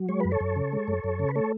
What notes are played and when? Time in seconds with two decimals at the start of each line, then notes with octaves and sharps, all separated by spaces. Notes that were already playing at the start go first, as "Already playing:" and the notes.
Already playing: F#3
0.09 G#3 C#5
0.20 F#2 B4
0.32 A4 C#5
0.41 F#2
0.56 C#3
0.73 G#3
0.88 F#2
1.04 F#2
1.19 C#3
1.29 B4
1.35 A3 A4 C#5